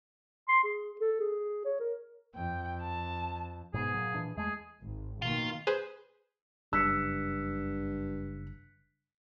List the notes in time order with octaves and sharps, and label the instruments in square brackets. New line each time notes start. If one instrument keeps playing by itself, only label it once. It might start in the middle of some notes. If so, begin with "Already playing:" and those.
[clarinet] C6
G#4
A4
G#4
C#5
A#4
[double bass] F2 [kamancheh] G5
[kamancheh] A5
[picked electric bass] G#2 B2 B3 [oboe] G#4
[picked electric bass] A#2 F#3
A#2 E3 D4
[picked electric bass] E2 G#3 A3 [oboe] G#4
[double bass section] G#1
[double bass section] B2 D#3 A#3 [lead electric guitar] F4
[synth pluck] G#4 B4 C5
[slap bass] F#1 C#3 [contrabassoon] G2 [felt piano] E6 [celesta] F#6 B6 C#7